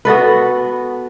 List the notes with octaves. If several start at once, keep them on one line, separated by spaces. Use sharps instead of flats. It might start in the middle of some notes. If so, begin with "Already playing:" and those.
B3 F#4 A4 B4